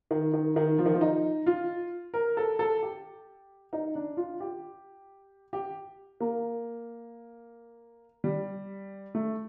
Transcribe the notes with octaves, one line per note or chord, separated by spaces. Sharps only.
D#3
D#3
D#3
F3
D#3
F3
D#4
F4
A#4
A4
A4
G4
D#4
D4
F4
G4
G4
A#3
G3
A3